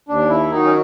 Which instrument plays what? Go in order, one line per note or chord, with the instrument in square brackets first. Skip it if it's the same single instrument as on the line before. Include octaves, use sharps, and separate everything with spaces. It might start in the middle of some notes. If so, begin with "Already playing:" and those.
[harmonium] D#2 D4
E4
D#3 F#3 D#4
C#4